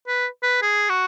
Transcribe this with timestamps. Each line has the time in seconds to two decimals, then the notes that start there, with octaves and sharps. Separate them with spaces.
0.07 B4
0.43 B4
0.62 G#4
0.89 F#4